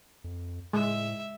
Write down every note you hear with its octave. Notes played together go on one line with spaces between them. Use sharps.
F2
A2 G#3 E5